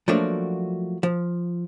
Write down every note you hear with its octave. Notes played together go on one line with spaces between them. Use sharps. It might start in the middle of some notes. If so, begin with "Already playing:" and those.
F3 F#3 A3 A#3 D4 F#4
F3